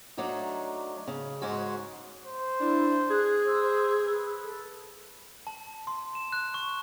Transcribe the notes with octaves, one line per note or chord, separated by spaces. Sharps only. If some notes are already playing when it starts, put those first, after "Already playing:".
F#3 A3 D4 D#4
C#3
G#2 G#3 C#4 F#4
C5
D4 E4
G#4 F#6
C5 E6
B4
A4
A5
C6
E7
F#6
C#6